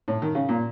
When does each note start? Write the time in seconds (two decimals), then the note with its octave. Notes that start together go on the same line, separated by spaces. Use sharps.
0.08 A2
0.22 D#3
0.35 C#3
0.49 A#2